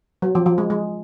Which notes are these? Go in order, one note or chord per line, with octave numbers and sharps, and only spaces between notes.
F#3
F3
F3
G#3
G#3